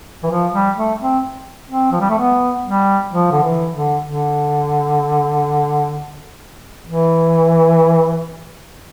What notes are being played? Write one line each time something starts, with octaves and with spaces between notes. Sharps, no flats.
E3
F3
G3
A3
C4
C4
F3
G3
A3
B3
G3
F3
D3
E3
D3
D3
E3